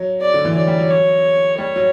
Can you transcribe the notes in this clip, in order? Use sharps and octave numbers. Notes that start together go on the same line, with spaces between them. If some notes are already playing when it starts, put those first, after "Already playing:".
Already playing: F#3
D5
D3
E3
F#3 D5
G3
F#3
C#5
G3 C#5
F#3